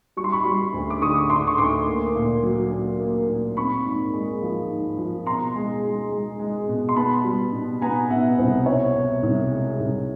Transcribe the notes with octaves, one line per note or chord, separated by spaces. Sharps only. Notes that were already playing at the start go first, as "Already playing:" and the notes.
G3 C#6
C6
B5 C#6
G3
D2
D6
D3 C#6 D#6
D3 C6 D6
C#6
D2 C6 D6
A#3
A#2
F#3
A#2
A#3
A#2
C4 B5 C#6
G#2
G#3
F3
G#2
F3
B2 A#5 C6
G#3
G#3
G#3
G#3
B2
C6
B3 A5 B5
G3
B2
B3 G#5 A#5
B2 E5 F#5
C2 C5
B2 C#5
B2
C2
G#3
C2